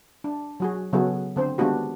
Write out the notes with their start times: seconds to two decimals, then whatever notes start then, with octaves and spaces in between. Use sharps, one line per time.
0.24 D4
0.60 F#3 F#4 G#4
0.93 C#3 F#3 B3 F#4 G#4 A4
1.36 D3 C4 C5
1.58 D#3 G#3 B3 D4 F#4 G4